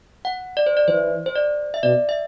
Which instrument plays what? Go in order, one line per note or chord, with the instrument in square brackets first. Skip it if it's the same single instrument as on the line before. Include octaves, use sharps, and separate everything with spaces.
[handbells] F#5
D5
C5
D5
[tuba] E3 [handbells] C5
[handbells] C5
D5
E5
[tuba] B2 [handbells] D5
[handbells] E5